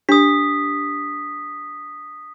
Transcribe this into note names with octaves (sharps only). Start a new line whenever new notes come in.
D4 G4 D#6 B6